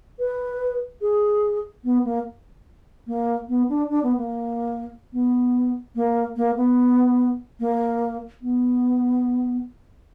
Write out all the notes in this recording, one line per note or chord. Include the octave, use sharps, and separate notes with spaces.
B4
G#4
B3
A#3
A#3
B3
D4
D4
B3
A#3
B3
A#3
A#3
B3
A#3
B3